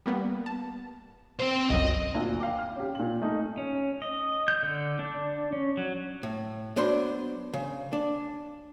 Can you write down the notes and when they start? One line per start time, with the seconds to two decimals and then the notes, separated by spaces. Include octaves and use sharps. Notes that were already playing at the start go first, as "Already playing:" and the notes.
0.06 G3 A#3 B3
0.46 A5
1.40 C4 C5
1.70 G1 C2 F#2 D#5
2.14 D2 A#2
2.40 F5 G5 D6
2.59 F6
2.76 C#4 G4
2.95 A#2 F#7
3.22 A3 D#4
3.58 C#4
4.02 D#5
4.48 G6
4.63 D3
4.99 D4
5.53 C#4
5.77 F#3
6.23 A2
6.76 F#3 B3 D4 C5 C6
7.54 C#3
7.93 D4